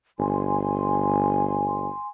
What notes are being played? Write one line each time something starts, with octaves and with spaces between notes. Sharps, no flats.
G1 G#5 C6